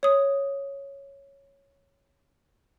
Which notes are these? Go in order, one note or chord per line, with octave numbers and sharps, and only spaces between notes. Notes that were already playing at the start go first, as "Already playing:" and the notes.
C#5 D#6